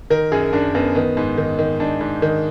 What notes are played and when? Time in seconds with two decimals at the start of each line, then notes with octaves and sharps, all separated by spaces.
0.10 D#3 A#4
0.32 F#2 G#4
0.53 F#2 D4
0.74 F#2 B3
0.95 D#3 B3
1.17 G#2
1.38 D#3
1.59 D#3
1.80 G#2 D4
2.01 G#2
2.22 D#3